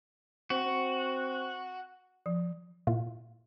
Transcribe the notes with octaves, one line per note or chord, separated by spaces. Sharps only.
C4 F#4
C4
F3
A#2 E4 F4